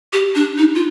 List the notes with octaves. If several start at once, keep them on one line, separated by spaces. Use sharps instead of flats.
G4
D4
D#4
F4